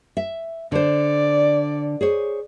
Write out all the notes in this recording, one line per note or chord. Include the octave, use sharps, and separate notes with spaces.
E5
D3 C5 D5
G#4 C5 C#5